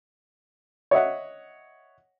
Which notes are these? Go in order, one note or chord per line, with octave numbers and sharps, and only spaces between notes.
C#5 D#5 E5 F#5